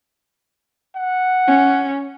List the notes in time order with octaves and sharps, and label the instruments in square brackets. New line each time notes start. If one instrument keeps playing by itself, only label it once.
[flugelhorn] F#5
[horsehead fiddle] C#4